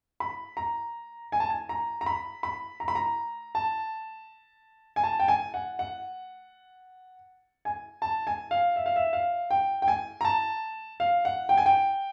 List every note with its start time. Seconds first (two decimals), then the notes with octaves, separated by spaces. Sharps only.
0.20 B5
0.57 A#5
1.32 G#5
1.40 A5
1.50 G#5
1.69 A#5
2.01 A#5
2.06 B5
2.43 B5
2.80 A#5
2.88 B5
2.95 A#5
3.55 A5
4.96 G#5
5.04 A5
5.20 G5
5.28 G#5
5.54 F#5
5.79 F#5
7.65 G#5
8.02 A5
8.27 G#5
8.51 F5
8.76 E5
8.86 F5
8.96 E5
9.13 F5
9.51 G5
9.82 G5
9.88 G#5
10.21 A#5
10.25 A5
11.00 F5
11.25 F#5
11.49 G5
11.57 G#5
11.66 G5